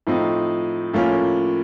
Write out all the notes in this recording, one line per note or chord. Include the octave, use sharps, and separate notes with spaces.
A2 F3 C4 D#4
A2 F3 A#3 C#4